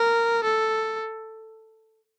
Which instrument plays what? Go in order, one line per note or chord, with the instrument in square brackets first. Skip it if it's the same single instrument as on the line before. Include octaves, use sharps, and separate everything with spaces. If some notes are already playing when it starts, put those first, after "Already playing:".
Already playing: [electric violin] A#4
A4